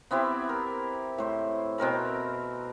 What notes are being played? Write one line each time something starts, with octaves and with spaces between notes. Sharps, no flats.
B3 C4 E4 G4
A#4
A2 C5
B2 C4 A#4 B5